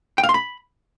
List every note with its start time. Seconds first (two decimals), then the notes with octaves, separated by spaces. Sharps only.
0.18 G5
0.23 F5
0.29 C6
0.34 B5